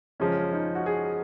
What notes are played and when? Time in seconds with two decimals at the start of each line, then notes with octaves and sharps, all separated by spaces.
0.20 F#2 C#3 F3 G#3 C#4
0.53 D#4
0.75 F#4
0.86 G#4